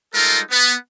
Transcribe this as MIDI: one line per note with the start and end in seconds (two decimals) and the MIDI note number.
0.14 0.40 55
0.14 0.40 56
0.14 0.40 63
0.14 0.40 65
0.14 0.40 69
0.14 0.40 70
0.51 0.73 59